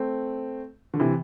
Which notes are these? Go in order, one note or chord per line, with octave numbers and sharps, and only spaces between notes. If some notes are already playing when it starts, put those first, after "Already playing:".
Already playing: A3 C4
D3
C3 E3